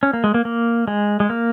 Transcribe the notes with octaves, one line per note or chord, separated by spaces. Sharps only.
C#4
A#3
G#3
A#3
A#3
G#3
G#3
A#3